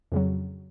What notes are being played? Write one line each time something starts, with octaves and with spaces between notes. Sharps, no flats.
F2 C#3 F#3